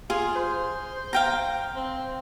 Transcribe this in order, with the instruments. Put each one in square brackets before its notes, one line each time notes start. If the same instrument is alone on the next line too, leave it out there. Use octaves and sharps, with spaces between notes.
[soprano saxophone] F4 [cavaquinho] G#4
[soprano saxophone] C5
[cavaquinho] F5 G5 A#5
[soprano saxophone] C4